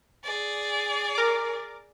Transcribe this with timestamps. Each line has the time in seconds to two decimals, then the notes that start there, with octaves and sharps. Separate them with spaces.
0.23 G#4 D5
1.15 A#4 D6